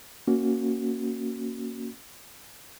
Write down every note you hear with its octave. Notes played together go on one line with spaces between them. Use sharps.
A#3 C#4 F#4